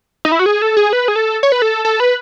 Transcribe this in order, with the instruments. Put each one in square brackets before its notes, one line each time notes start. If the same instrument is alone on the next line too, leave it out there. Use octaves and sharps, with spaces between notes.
[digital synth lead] D#4
E4
F#4
G#4
A4
G#4
B4
G#4
A4
C#5
B4
A4
A4
B4